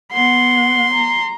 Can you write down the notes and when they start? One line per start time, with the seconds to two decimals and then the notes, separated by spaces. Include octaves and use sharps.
0.13 B3 F#5 C6
0.93 A#5